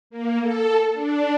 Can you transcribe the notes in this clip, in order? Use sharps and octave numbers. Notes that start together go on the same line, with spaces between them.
A#3
A4
D4